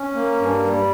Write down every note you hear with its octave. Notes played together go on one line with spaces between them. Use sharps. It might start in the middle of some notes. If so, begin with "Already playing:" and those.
Already playing: C#4
A#3
G2
G3